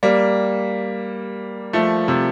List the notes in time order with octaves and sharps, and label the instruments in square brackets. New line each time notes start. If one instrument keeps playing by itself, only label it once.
[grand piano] G3 A#3
F3 A3
C3